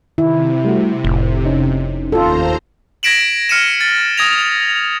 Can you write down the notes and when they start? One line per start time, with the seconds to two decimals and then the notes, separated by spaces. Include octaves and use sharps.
0.18 C3 D#3 E4
0.65 G3 A3 F#4
1.04 F1 A2
1.45 C#4 D#4
2.12 D#2 F4 A4 C5 A#5
3.03 G#6 A#6 B6 D7 E7 F#7
3.49 F6 C#7 D#7 E7
3.81 A6
4.18 D#6 G#6 A#6 F7